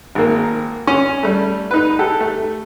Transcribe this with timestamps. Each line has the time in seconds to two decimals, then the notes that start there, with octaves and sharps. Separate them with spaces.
0.15 G#1 A#3
0.87 C#4
1.23 G3 A3
1.71 D#4 B4
1.99 G4 A4
2.20 A3